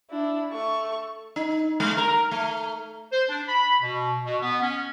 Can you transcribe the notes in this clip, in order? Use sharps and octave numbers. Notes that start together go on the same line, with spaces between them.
D4 E4
A3 C#6
D#4
G#3
A#4
A3
C5
D4
B5
B2
B2
B3
C#4